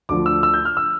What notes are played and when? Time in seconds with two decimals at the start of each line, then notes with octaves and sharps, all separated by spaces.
0.09 D2 D3 F3 D6
0.26 E6
0.43 E6
0.54 G6
0.65 F6
0.77 E6